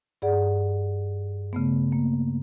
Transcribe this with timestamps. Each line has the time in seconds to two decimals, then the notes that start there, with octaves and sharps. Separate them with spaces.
0.22 G2 G#4 D5 F#5
1.53 C#3 A3 B3
1.92 A#3